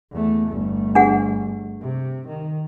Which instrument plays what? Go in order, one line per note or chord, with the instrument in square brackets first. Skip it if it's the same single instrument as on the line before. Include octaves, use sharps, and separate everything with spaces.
[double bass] E2 A3
G1 A3
[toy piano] D4 G#4 F#5
[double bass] C3
D#3